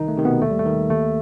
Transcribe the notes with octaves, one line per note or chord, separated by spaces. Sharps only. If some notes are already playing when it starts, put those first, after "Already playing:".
Already playing: C2 D#3 D#4
A3
C3 D#3
B2 B3
D#2 A3
G3
A3
D#3
D#2 A3